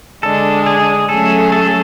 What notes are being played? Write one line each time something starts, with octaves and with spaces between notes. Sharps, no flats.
D3 G#3 D4 A4
G#4
F#3 A3 C#4 G#4 A4
A4